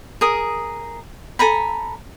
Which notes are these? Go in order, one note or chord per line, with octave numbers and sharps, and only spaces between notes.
G#4 A#4 D#6
A4 G#5 A#5 B5